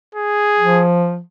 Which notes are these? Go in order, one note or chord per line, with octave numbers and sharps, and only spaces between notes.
G#4
F3